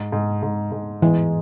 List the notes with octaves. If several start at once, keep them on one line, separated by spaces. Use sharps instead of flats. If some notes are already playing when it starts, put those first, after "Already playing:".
Already playing: G#2
G#2
G#2
G#2
E3 G#3